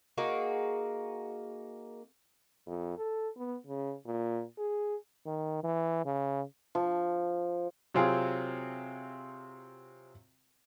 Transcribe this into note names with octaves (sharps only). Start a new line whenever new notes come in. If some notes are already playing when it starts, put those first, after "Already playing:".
A#3 D#4 F#4 G#4
F2
A4
B3
C#3
A#2
G#4
D#3
E3
C#3
F3
C3 F#3 C4 F4 G#4